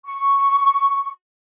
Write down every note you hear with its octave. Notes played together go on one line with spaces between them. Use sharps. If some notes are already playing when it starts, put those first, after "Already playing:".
C#6